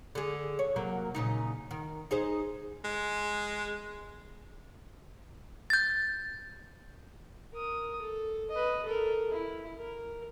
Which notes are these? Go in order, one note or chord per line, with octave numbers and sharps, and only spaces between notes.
D3 G#4
C#5
C3 F#3 A#3
A#2 C#3 D#4
D#3
D#4 G#4 C5
G#3
G6 A6
A#4 D#6
A4
B4 D#5
A4 A#4
E4
A#4